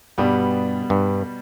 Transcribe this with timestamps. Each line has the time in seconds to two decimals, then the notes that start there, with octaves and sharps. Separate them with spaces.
0.18 G2 B2 G3 B3
0.90 G2